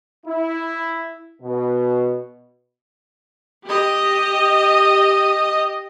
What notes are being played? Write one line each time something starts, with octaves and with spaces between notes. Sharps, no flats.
E4
B2
G4 D#5